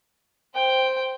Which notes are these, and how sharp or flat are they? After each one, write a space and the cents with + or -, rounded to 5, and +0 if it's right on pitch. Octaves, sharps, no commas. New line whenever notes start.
C5 +0 G5 +0